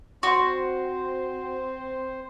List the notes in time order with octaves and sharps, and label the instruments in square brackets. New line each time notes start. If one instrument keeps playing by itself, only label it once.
[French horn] C4 [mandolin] F#4 [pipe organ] C5 [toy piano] C6 C#6